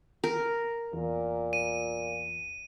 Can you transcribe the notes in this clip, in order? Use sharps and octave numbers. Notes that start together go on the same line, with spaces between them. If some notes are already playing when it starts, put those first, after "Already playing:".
A#4
E2 A#2
D#7